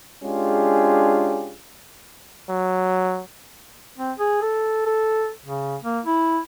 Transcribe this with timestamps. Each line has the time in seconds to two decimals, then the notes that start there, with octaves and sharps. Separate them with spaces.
0.24 G#3 C#4 D4 F4 G4 G#4
2.49 F#3
3.98 C4
4.19 G#4
4.42 A4
4.86 A4
5.45 C#3
5.83 A#3
6.05 E4